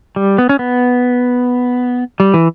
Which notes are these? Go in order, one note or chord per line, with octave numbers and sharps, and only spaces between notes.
G3
B3
C#4
B3
G3
E3